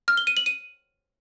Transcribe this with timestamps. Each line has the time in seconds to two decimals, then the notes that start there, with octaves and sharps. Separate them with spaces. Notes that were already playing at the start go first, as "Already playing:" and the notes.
0.08 F6
0.17 G7
0.27 D#7
0.37 F#7
0.46 D#7